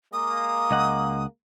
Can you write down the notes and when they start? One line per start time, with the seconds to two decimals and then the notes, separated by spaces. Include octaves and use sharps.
0.13 G#3 A#3 D#6
0.71 C#2 D#5 F#5